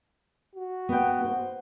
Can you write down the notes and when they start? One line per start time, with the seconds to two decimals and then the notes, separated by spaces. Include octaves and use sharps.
0.55 F#4
0.89 B3 G5
1.25 C5